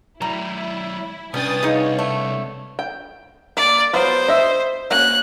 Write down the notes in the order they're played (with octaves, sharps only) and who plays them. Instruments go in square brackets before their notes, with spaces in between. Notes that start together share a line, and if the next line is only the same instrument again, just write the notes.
[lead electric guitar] F#3 D5 [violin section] E4 [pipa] A#5
[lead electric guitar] C2 G5 [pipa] C#4 [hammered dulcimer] D4 B4 [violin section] G#5 D#6 A6
[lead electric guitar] C2 [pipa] D#4 G#4 [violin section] C#5 [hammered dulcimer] F5 F#5
[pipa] A3
[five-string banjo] G5
[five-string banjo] A#3 [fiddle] D5
[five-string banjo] F#3 B3 F4 [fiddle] C5
[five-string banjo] D#5 E5
[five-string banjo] A#3 C#4 F#4 [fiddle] F#6